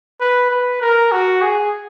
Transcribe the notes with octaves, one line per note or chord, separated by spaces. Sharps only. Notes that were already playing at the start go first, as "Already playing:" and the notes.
B4
B4
A#4
F#4
G#4